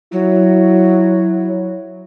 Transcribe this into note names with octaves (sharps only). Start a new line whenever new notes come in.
F#3 E4